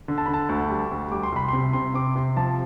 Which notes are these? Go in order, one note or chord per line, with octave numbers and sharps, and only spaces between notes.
D3
A5
D3 B5
A5
D2
G3
D2
G3 D6
C6
C2 B5
C3 C6
C3 C6
C3 D6
C3 C6
F3 A5